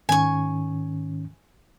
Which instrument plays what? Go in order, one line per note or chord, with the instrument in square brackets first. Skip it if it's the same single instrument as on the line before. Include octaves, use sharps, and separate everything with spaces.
[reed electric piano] G#2 D#3 C#4 [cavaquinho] G#5 C#6